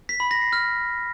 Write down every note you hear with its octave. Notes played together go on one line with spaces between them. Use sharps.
B6
B5
A#6
C7
F6